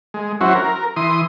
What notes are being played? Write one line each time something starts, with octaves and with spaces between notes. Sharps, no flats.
G#3
F#3 C#4 E4 F#4 C5
A#4
E3 C6 D#6